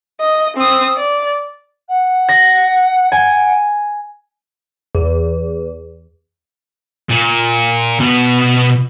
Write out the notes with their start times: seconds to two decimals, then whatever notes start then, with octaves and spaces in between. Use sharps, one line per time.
0.20 D#5
0.57 C4 D#6
0.96 D5
1.88 F#5
2.29 A#6
3.12 G#5
4.95 E2
7.09 A#2
8.00 B2 B3